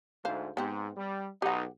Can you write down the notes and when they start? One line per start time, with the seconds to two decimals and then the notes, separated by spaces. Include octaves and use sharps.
0.25 D2 G#2 C5 F5
0.57 G#2 B3 C4 G4
0.97 G3
1.42 B1 D#4 G4 F#5